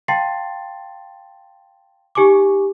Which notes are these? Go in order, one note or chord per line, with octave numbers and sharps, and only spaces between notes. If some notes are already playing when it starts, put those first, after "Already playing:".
F5 G5 A5 C6 A6 C7
D#4 G4 G#5 C#6 D6